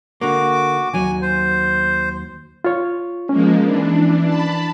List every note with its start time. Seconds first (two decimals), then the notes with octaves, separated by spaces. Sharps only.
0.21 D3 A#3 F#4 D6
0.94 D#2 F#3 G#5
1.22 C5
2.64 F4 C#5
3.29 F3 G#3 A#3 C#4
3.63 E3 D4
4.26 A5 B5